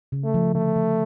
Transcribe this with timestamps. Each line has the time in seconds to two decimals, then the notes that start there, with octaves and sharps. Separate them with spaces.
0.12 C#3
0.24 A3
0.34 F3
0.55 D3 A3
0.76 F3